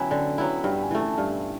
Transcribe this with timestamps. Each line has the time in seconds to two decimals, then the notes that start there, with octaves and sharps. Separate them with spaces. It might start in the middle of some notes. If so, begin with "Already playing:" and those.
Already playing: F#3 B3 E4 G5 G#5
0.11 D3 G#5
0.38 F#3 B3 E4
0.64 G2 G5
0.82 G#5
0.91 E3 A3
1.00 A5
1.18 G2